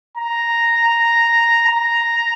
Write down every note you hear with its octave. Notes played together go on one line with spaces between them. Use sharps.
A#5
A#5